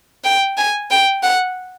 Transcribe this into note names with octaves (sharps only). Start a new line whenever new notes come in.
G5
G#5
G5
F#5